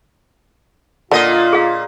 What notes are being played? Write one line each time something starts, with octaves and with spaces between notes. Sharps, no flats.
A#2 D3 A#3 D#4 F4 D#5
G#4 F5